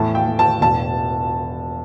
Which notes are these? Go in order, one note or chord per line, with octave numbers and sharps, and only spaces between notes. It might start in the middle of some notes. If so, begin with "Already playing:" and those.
Already playing: E2 A2 A5
G5
A2
A5
E1 A5